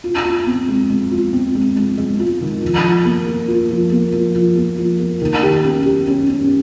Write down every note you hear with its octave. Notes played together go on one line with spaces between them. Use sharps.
F4
F4
C4
G#3
G#3
F4
C4
G#3
G#3
G#3
F4
D#3
F3
F3
A#3
A#3
F4
F3
A#3
F3
F3
A#3
F3
A#3
D#3
G4
C#4
G4
C#4
C#4